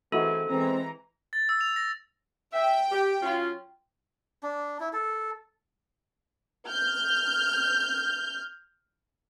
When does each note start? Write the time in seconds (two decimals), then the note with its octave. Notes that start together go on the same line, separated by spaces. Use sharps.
0.12 E3 C4 D#4 E4 F#4 G#4 A4
0.49 E2 E3 G#3 C4 A#5
1.33 A6
1.49 E6
1.61 F7
1.76 A#6
2.53 E5 G5
2.91 G4
3.22 F#3 C#4 F4
4.43 D4
4.80 E4
4.93 A4
6.68 F6 G6